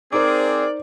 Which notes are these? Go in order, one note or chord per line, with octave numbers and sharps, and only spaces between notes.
C4 D#4 G#4 A#4 C5 D5 D6